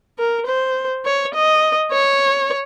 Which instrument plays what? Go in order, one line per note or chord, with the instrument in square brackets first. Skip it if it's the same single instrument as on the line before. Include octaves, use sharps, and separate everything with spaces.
[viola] A#4
C5
C#5
D#5
C#5